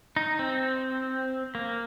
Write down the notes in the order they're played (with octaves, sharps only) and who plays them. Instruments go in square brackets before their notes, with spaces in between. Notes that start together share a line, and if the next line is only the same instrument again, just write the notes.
[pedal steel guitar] D#4
C4
A#3